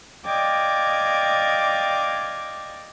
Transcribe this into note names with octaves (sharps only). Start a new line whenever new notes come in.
D5 D#5 F5 G5 D6 G#6